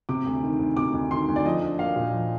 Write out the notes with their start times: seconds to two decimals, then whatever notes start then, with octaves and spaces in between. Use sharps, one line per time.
0.09 C3 D6
0.26 D2
0.43 D#3
0.59 D2
0.77 C3 D6
0.94 D2
1.10 D#3 C6
1.28 D2
1.36 D5
1.45 F3 D#5
1.62 D4
1.79 A#3 F5
1.96 A#2
2.13 F3